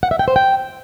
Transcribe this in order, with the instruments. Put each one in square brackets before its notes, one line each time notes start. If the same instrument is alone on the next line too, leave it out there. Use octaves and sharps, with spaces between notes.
[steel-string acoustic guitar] F#5
E5
G5
C5
G5